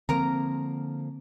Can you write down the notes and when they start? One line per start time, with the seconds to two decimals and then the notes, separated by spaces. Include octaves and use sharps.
0.09 D3 F3 A#3 C4 A#4 A#5